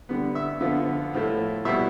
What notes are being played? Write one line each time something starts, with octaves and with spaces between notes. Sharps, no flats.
D3 G3 B3
E5
D3 F3 B3 F4
A2 F3 A3 E4
B2 G3 B3 E4 E5